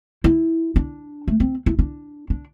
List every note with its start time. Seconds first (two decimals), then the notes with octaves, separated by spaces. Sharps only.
0.24 E4
0.76 D4
1.28 A3
1.40 C4
1.66 E4
1.79 D4
2.30 D4